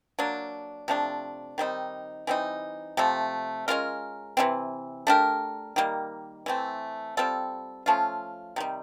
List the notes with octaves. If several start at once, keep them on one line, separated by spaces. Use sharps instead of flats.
F#3 A#3 D4
C3 F3 A3 D4
D#3 G3 C4 D#4
E3 G3 C4 D#4
C3 F3 A3
G#3 C#4 F4 A#4
C3 E3 G3 C4
A3 D4 G4 A#4
D#3 G3 A#3
E3 A3 C4
G3 C4 F4 A4
F3 A3 C#4 F4
C3 D#3 G3